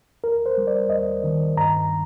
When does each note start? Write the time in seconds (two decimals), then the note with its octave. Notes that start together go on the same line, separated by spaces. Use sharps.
0.23 D#2 A#4
0.46 C5
0.57 G3
0.67 D5
0.90 D#2 D#5
1.24 D#3
1.56 G2 A#5